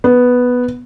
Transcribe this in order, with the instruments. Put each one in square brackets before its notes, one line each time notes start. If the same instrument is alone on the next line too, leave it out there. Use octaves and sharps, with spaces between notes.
[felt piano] B3